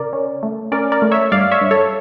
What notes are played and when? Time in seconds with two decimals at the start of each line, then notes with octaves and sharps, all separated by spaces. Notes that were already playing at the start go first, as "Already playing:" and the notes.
Already playing: C#3 A#4 D5
0.13 C#4
0.43 A3
0.72 C#4 A#4 D5
0.92 A#4 D5
1.02 A3
1.12 C#5 E5
1.32 G2 D5 F5
1.52 C#5 E5
1.61 G2
1.71 A4 C#5